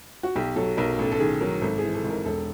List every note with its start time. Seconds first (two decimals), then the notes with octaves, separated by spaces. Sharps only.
0.23 F#4
0.36 B1 G4
0.56 F#3 A4
0.77 B1 A#4
0.99 A1 A4
1.12 A4
1.19 D#3 G#4
1.41 F#3 A#4
1.61 G#1 A4
1.78 E3 G#4
1.94 A4
2.04 G#1
2.10 A#4
2.25 E1 A4